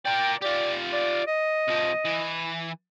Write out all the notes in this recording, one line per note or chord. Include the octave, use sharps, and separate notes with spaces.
A#4 D5 G5
F4 G4 D5
D5
D#5
C2 F3
E3